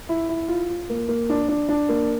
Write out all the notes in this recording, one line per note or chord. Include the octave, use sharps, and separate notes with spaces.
E4
E4
F4
F4
A#3
A#3
D4
D4
D4
A#3